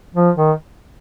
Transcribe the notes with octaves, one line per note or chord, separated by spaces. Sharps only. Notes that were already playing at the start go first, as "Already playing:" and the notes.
F3
D#3